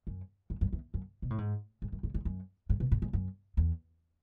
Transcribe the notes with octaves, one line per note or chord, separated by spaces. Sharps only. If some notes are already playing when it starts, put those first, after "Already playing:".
F#2
F#2
F#2
E2
F#2
B2
A2
G#2
G#2
F#2
G#2
G#2
F#2
G#2
B2
A2
G#2
F#2
E2